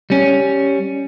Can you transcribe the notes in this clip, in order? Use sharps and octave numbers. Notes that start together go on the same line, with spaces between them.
G3 C#4